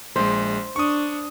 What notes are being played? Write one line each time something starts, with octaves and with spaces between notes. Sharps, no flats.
A#1 G#3 C5
D4 C#6 D#6